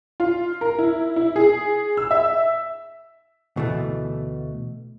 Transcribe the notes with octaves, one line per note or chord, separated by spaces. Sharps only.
F4
A#4
E4
E4
G#4
E6
E5
D2 B2 E3 A3